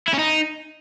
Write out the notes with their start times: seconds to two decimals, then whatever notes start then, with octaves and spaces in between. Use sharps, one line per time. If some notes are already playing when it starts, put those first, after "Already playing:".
0.08 E4
0.14 C#4
0.19 D#4